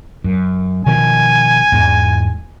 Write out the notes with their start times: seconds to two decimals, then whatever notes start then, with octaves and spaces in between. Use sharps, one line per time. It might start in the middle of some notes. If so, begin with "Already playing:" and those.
0.24 F#2
0.86 B2 D#3 F3 G#5
1.72 E2 G#2